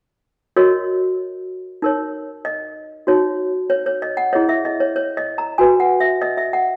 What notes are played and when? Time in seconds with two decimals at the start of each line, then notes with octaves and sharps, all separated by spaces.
0.56 F#4 A#4 C#5 D#5
1.82 D#4 A#4 C#5
2.45 D#5
3.07 D#4 F#4 C#5
3.70 C#5
3.86 C#5
4.02 D#5
4.17 F#5
4.33 E4 G#4 C#5 D#5
4.49 E5
4.65 D#5
4.80 C#5
4.96 C#5
5.17 D#5
5.38 A#5
5.58 F#4 B4 G#5
5.80 F#5
6.00 E5
6.22 D#5
6.37 E5
6.53 F#5